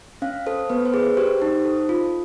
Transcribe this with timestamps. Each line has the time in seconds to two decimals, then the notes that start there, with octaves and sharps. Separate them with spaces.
0.22 C#4 F5
0.46 A4 C5
0.70 B3 B4
0.85 C5
0.94 G#4 B4
1.17 G4 C5
1.42 D#4
1.65 A4
1.89 F4